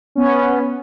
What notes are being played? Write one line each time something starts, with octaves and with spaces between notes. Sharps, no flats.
B3 C#4